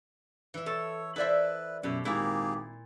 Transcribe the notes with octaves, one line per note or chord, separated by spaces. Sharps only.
E3 E5
A4 C#5
E4 A4 B4 C5 D5 E5
F#2 B2 E4 G4
G#1 A#2 A#3 E4 G4 G#4 A#5